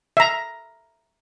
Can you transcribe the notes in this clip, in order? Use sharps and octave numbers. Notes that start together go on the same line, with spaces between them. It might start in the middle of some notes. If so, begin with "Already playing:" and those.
E5 A#5